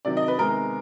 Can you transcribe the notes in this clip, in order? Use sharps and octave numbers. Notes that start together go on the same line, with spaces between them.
C3 D#3 F#3 D5
D#5
B4
C3 D#3 G#3 B3 A#4